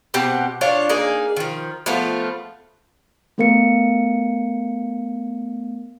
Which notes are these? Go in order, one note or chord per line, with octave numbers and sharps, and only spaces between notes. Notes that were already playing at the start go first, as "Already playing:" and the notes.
B2 C4 G4 F#5
D4 F4 C#5
A#3 D#4 G#4
D#3 F3
F3 A3 B3 F4
A3 B3 A#4 F5 C#7